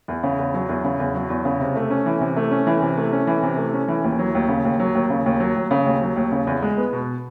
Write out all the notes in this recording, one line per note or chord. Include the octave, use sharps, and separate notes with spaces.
E2
C#3
E2
F#3
E2
C#3
E2
F#3
E2
C#3
C3
A3
C#4
E3
C3
A3
C#4
E3
C3
A3
C#4
E3
C3
A3
C#4
E3
D#2
F#3
D#2
C#3
D#2
F#3
D#2
C#3
D#2
F#3
D#2
C#3
D#2
F#3
D#2
C#3
E2
G#3
B3
B2